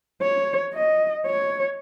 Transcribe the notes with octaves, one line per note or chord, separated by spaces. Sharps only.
C#5
D#5
C#5